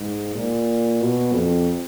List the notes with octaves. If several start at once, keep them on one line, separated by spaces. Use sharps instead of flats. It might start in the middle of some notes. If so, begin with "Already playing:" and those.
Already playing: G#2
A#2
B2
F2